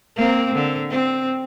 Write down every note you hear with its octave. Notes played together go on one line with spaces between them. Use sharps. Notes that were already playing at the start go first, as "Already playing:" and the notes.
A#3 C4
D3
C4